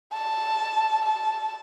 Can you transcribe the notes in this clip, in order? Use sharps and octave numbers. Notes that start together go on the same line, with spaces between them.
A5
A5